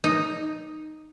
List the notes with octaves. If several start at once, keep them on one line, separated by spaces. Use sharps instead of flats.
D#4